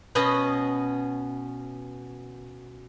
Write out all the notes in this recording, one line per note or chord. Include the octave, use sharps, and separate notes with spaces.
B2 B3 C#4 D#5